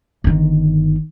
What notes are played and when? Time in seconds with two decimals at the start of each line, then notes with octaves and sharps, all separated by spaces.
0.24 G1 D#3